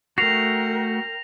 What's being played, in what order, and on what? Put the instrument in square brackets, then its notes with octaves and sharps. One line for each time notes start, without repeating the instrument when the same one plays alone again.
[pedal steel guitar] A3 F#4 [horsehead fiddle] A#4 G5 [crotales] A#6 F7 [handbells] C7